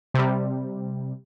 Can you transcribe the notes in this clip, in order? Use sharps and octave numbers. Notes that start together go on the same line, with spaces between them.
C3 G3